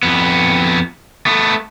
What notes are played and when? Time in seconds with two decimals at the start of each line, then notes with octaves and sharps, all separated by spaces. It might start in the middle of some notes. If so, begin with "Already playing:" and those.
0.03 F2 B3
1.26 A3 B3